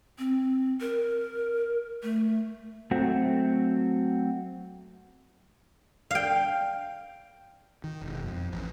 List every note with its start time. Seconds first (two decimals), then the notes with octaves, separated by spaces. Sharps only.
0.18 C4
0.81 A#4
2.03 A3
2.91 F#3 A3 C4 F#4
6.11 F5 G5
7.84 D#3
8.02 E1
8.24 F2
8.52 A1